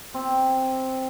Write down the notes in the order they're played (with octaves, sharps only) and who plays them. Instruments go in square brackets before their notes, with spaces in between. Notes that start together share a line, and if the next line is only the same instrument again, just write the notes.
[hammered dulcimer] C4